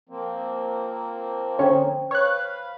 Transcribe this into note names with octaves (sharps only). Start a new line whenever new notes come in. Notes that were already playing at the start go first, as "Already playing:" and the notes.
F3 A#3 C4
D3 C#4 C5 C#5 G5
B4 C#5 F5 F#6